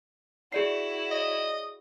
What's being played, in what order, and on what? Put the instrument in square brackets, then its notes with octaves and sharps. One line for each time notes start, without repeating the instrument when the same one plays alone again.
[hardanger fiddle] E4 F#4 [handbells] G#4 D5 C7
[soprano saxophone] D#5